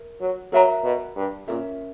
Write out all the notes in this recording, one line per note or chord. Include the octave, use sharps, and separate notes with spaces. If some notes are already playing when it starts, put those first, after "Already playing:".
Already playing: A#4 E5
F#3
F#3 A#4 E5 A#5
B2
G2
A#2 C#4 F#4 A#4 E5